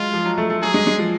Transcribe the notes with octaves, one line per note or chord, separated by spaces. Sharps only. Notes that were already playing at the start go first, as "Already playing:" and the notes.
Already playing: F#3 G#3 F4
F3
F#3
A3
A3
F#3 G#4
G#3
G#3
F3